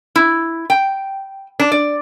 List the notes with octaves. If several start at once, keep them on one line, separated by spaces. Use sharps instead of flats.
E4
G5
D4
D5